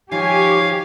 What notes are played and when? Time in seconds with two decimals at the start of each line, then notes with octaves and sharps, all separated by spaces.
0.11 D#3 F3 D#4 G4 C#5 F5 G#5